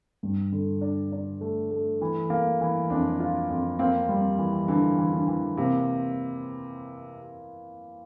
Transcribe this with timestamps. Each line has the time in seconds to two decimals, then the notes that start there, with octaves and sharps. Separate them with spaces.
0.23 G2
0.52 D3
0.81 D4
1.12 D4
1.41 A3
1.71 A3
2.01 E3
2.30 A#3
2.61 E3
2.90 F2 D4
3.20 F4
3.50 F2
3.79 A#3 C4
4.09 G3
4.39 E3
4.68 D3 E3
4.99 E3
5.13 D3
5.28 E3
5.57 C3 A#3